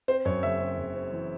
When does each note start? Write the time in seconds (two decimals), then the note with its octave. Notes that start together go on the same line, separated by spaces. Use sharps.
0.08 C4 C5
0.25 F#2 C#5
0.43 F#1 E5
0.60 C4
0.78 F#1
0.95 C4
1.12 E3